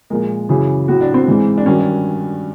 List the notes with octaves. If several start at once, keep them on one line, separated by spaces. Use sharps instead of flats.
A#2 F3 G#3 A#4
F#2 C#3 E3 G#4
A2 F#3 F#4
D4
C4
G#2 E3 G#3
D4
G2 D#3 F#3 C#4
D4